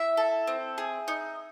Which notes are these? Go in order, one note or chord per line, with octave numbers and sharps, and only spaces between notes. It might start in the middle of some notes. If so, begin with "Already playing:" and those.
Already playing: E4 E5
A4
C4
G#4
D#4